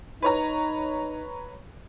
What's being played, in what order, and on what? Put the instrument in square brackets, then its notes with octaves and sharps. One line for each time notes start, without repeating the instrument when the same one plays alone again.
[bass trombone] D#4 [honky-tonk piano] B4 C#5 A#5